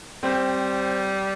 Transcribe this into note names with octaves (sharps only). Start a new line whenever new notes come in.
G3 C4 C5